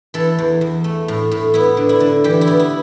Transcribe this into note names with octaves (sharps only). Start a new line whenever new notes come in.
E3 A4
E2
E2
A3
A2
A2
B3 E4
D3
E4
D3
E3 G4
E4
B3
E4